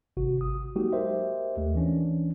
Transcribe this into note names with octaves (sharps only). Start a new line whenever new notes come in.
G#1 C3 F#4
D#6
F#3 G#3 A#3 D#4 F#4 G4
G4 A#4 C5 D#5 E5
D#2 A3
E3 C#4 D4